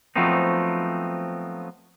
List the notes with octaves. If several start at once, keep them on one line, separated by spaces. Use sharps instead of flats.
F3 F#3 A3 B3 C4 D#4